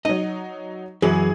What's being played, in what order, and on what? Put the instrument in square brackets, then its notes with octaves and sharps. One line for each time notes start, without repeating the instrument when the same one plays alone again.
[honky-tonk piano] F#3 D#4 [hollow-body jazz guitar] D#5
[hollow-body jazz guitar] F#2 E3 [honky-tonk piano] G#4 F#7